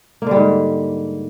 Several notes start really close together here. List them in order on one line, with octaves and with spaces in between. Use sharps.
A#3 D3 G3 G#2